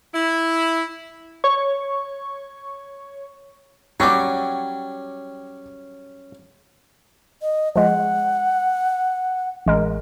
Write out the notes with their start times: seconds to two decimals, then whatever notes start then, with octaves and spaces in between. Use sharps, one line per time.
0.14 E4
1.44 C#5 C#6
4.00 F#3 G3 C#4 F#5 G5 C#6 D6
7.42 D#5
7.76 F3 G#3 F#5
9.66 A1 G#3 A#4